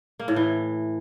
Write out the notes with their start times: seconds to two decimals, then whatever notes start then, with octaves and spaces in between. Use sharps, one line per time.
0.19 A#3
0.28 A2
0.36 E3